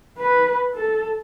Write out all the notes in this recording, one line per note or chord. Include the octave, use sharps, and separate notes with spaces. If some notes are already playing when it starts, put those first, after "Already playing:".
B4
A4